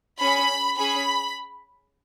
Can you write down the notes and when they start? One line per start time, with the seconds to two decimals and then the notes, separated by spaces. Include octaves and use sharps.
0.20 C#4 G#4 B5
0.77 C#4 G#4 B5